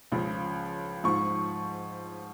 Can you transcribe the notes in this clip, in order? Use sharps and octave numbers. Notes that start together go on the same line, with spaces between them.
C#2 C#3 F3
G#2 F3 C#6